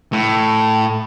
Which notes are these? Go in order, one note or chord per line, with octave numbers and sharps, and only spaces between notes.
A2